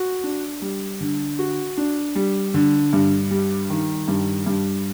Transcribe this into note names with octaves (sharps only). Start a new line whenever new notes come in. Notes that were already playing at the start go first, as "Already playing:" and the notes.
Already playing: F#4
D4
G3
D3
F#4
D4
G3
D3
G2
G3
D#3
G2
G2